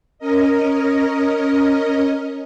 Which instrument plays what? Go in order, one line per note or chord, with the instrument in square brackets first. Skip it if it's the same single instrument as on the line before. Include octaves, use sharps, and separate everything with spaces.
[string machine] C#4 A#4 D#5